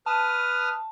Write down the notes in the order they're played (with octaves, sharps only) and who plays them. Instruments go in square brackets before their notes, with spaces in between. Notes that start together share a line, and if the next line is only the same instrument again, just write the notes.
[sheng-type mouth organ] B4 D#6 F6 [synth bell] A5